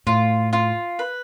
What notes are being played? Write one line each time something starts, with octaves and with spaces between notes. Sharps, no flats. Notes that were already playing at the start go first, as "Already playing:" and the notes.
A2 F4
F4
B4